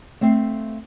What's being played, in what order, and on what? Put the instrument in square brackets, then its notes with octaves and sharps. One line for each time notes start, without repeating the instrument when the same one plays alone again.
[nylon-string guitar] A3 C4 E5 F5